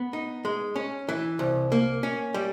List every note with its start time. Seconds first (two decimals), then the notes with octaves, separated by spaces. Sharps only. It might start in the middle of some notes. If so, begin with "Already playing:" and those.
Already playing: B3
0.13 D#4
0.45 G#3
0.76 C#4
1.09 E3
1.39 C2
1.72 A#3
2.03 C#4
2.34 G3